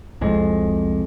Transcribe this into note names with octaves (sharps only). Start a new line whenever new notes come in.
C2 F2 G#3